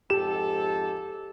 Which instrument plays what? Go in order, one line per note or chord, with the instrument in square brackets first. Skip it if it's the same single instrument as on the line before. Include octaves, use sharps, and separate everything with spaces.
[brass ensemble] F2 G#2 A4 [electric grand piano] G4 E7